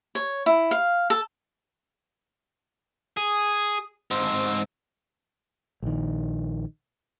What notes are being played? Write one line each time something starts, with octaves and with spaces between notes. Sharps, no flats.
C#5
E4
F5
A4
G#4
G#2 C4
A#1 D#3